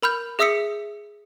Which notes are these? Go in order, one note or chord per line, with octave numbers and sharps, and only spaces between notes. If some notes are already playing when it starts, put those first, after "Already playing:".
A#4 B5 F6 G6
G#4 E5 D#6 E6 B6 C#7